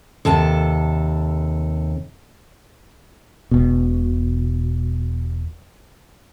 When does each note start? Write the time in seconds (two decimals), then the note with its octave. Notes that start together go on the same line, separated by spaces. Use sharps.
0.25 D#2 C3 A4 A5
3.51 E1 B2